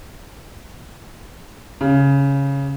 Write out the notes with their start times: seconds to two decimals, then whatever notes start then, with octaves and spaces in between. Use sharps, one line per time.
1.81 C#3